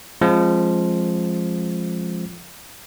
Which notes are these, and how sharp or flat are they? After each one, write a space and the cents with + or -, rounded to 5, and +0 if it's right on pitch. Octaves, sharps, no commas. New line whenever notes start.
F3 +0 G#3 +0 C4 +35